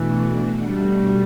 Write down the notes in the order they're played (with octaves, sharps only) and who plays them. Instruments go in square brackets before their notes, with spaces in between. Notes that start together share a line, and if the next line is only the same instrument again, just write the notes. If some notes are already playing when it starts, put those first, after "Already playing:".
Already playing: [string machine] B2 A3 D4 F#4 [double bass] E3
[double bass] G3